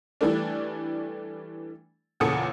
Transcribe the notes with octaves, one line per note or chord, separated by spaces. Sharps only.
E3 G3 A3 D4
E2 A#2 C#3 A4 D#6 C#7